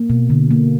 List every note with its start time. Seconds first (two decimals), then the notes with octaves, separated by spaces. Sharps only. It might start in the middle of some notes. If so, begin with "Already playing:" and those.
Already playing: A#3
0.10 B2
0.30 D3
0.51 A#3